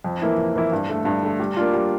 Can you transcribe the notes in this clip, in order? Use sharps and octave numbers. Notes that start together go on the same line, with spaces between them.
F2
E3 A#3 E4
F2
E3 A#3 E4
G2
D3 A3
G2
D3 A3
G3
A#3 D4 F4
G3